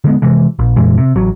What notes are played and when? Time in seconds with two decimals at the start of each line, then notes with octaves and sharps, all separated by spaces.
0.04 D3 G#3 B3
0.22 C3 E3 G#3
0.59 A#1
0.76 F2 A#2 E3 G#3
0.98 C3
1.15 A1 F#3